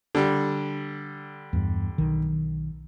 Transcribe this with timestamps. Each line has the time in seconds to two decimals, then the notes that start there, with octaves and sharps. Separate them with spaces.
0.15 D3 G3
1.53 E2 G2
1.98 B1 D#3